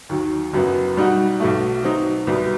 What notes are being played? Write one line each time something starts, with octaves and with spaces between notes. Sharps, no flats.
D#2 D#3 F#3
F#1 F#2 F#3 B3 F#4
B2 G3 D#4 F#4
B1 B2 A3
B2 F#3 C4 D#4
C2 B2 G3 B3